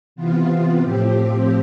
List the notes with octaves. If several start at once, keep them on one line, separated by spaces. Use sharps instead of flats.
C3 E3 B3 F4
A2 F3 C4 G4